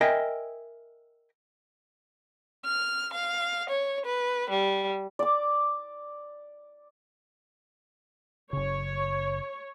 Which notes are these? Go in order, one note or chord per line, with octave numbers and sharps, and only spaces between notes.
A#4 D#5 E5 G5 G#5
F6
F5
C#5
B4
G3
D5 D6
F#1 C#3 C#5